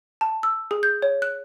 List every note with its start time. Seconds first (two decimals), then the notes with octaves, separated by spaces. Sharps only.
0.21 A5
0.43 E6
0.71 G#4
0.83 G6
1.02 C#5
1.22 F#6